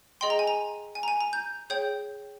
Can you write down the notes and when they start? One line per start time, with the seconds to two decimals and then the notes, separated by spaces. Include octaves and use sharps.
0.21 G#4 D#5 G5 C6
0.30 A#5
0.39 G#5
0.47 A#5
0.95 G#5
1.03 A#5
1.08 G#5
1.21 A#5
1.33 G6
1.70 G#4 C#5 G5 G6